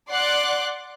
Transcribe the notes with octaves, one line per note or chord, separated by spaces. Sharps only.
D5 F#5 C6 D6 F#6